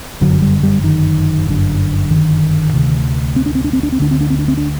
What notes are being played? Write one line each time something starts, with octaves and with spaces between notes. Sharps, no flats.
G1 F#2 D3 F#3
G3
G3
D#3
G1 F#2 D3
D#3
D2 C3
C4
D4
C4
D4
C4
D4
C4
D2 D3 D4
C4
D4
C4
D4
C4
D4